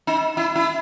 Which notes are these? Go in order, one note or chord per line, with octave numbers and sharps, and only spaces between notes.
D#4
E4
E4